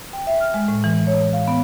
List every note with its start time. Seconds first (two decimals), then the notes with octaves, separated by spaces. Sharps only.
0.13 G5
0.27 E5
0.41 F6
0.54 G#3
0.68 A2
0.84 E3
1.07 C#5
1.33 F5
1.48 B3